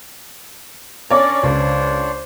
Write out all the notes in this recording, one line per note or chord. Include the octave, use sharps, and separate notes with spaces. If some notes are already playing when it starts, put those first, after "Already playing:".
C#4 D4 A#4 C#5 D5
C#2 D4 C5 C#5